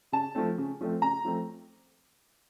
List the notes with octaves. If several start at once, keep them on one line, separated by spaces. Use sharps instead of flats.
C#3 A5
F3 A3 C4
C#3
F3 A3 C4
C#3 A#5
F3 A3 C4